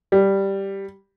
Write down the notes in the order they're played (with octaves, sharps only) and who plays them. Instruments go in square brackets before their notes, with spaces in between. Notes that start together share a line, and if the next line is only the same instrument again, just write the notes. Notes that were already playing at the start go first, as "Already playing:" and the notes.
[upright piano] G3